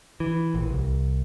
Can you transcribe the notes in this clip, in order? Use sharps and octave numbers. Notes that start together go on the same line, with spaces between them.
E3
A#1
C2